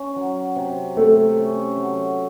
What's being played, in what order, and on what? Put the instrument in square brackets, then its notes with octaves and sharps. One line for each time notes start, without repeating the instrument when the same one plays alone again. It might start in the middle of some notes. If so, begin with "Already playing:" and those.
Already playing: [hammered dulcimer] C#4
F#3
C3
[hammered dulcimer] C3 [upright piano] A3
[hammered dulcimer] C#4
F#3